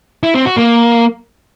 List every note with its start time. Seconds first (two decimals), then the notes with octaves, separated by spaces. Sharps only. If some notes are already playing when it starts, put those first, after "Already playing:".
0.23 E4
0.34 C4
0.46 F#4
0.57 A#3